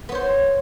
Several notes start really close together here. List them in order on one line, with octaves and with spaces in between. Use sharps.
B3 C#5 C5